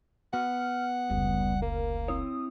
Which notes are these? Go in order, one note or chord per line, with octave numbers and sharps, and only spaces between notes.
B3 F#5 F6
F1 C#2 G3
A#3 A#4
C4 E4 C#5 D#6